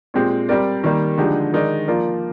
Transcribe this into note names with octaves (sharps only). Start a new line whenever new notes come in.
A#2 G#3 C4 G4
G3 C4 G4 A#4 D5
D#3 G3 A#3
D3 F3 G#3 D#4 G4
D#3 G#3 D#4 A#4 D5
F3 A#3 F4 A#4 D5